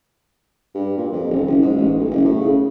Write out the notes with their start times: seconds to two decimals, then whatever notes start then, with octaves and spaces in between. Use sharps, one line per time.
0.75 G2
0.97 A#2
1.13 F2
1.30 D#1
1.46 F#1
1.62 G#2
1.77 A1
1.98 B1
2.11 F#1
2.25 A2
2.41 C#3